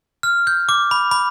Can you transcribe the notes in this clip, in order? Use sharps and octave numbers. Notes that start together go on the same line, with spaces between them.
F6
G6
D6
B5
B5